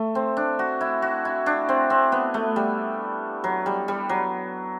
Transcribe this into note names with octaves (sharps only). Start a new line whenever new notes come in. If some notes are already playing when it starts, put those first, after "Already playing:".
Already playing: A3
C4
D4
F#4
E4
F#4
E4
D4
C4
C4
B3
A3
G3
F#3
G3
G3
F#3